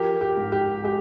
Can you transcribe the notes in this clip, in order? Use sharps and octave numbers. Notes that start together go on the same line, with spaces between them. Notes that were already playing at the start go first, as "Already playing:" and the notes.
Already playing: F3 G4 A#4
G4
G#2
G4
G#3 G4